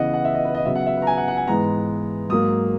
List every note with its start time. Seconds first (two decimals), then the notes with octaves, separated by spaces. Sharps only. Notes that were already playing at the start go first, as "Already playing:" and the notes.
Already playing: C#3 E3 B3 D#5 F#5
0.14 F#5
0.25 E5
0.35 D#5
0.45 B4
0.55 D#5
0.65 C#3 F#3 B3 E5
0.75 F#5
0.86 E5
0.97 B4
1.02 A#5
1.07 G#5
1.17 F#5
1.28 F#5
1.37 G#5
1.47 G#2 E3 G#3 B3 A#5
2.29 G#2 F#3 A#3 D#6